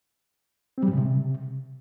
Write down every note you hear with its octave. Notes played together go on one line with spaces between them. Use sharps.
C4
G3
A2
C#3
C3